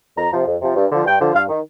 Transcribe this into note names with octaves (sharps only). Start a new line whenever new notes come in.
F2 A#5
C3 F3
F2
C3 F3
G2
D3 F3
G2 G5
D3 F3
G2 F5
D#3